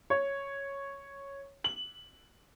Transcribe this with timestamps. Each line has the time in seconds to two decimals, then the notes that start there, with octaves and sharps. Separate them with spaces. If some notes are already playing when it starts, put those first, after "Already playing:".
0.10 C#5
1.64 F#7